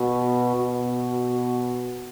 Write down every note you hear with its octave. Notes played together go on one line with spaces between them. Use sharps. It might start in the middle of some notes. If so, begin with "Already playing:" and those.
Already playing: B2
B2